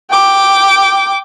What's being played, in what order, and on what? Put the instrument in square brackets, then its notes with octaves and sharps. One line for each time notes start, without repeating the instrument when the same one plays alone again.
[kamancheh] G5 D6